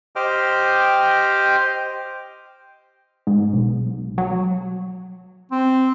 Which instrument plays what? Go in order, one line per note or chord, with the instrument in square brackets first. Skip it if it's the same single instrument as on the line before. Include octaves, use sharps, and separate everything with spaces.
[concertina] G4 C5 D#5 G5 D6 F6
[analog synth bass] G#2
B1
F#3
[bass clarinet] C4